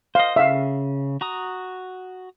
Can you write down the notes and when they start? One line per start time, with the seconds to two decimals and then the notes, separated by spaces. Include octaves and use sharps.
0.15 C5 D#5 F5
0.36 C#3 E5 F5
1.21 F#4 A#5 D#6